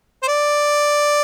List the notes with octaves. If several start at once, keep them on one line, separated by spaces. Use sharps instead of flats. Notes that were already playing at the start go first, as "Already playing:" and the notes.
C5
D5